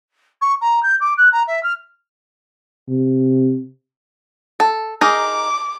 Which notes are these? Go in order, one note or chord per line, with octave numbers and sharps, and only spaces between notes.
C#6
A#5
G6
D6
F#6
A#5
E5
F6
C3
A4
D#4 G#4 A#4 D6